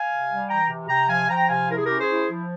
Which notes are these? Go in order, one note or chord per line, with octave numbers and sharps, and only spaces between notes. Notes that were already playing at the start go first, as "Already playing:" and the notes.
Already playing: F5 G#5
C3
G3
E3 G5 A#5
C3
C3 G5 A#5
F3 F5 G#5
F3 G5 A#5
C3 F5 G#5
E4 A#4
G#4
C#4 G4 A#4
G#4 C5
E4
F3